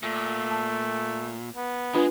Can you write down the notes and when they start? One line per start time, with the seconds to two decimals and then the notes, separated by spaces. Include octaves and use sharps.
0.03 A#2 A3
0.51 A5
1.55 B3
1.94 G#3 D4 F4 G#4 B4